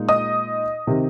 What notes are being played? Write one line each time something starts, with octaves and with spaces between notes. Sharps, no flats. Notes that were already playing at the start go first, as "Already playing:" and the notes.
Already playing: A#2 G#3 D#4
D#5 D#6
C3 D#3